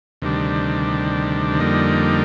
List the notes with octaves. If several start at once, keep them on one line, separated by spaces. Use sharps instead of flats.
D2 C3 D#3 G3 D4
F2 D3 G3 A#3 D#4